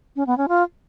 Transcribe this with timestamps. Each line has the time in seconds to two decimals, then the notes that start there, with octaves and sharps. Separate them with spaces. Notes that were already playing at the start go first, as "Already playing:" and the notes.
0.16 C#4
0.27 B3
0.38 C#4
0.48 F4